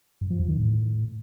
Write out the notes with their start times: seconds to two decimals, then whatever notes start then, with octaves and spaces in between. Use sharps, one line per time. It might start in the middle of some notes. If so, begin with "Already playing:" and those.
0.21 G2
0.30 F3
0.39 E2
0.48 D#3
0.58 A2